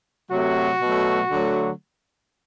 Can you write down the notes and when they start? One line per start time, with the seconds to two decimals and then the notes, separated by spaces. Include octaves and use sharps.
0.30 C3 F#3 A3 F#4
0.81 B2 F#3 A3
1.30 D3 F#3 A3